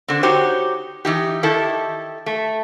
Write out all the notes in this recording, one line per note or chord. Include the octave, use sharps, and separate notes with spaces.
D3 C4
D#4 F#4 G4 C5 C#5
E3 D#4 G4
D#3 E4 G4 A4
A3